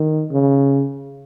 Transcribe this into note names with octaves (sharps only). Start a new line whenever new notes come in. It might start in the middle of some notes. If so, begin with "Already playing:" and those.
Already playing: D#3
C#3